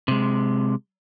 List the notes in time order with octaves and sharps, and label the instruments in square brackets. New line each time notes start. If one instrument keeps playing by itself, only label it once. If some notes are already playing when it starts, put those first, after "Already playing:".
[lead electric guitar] C3 G#3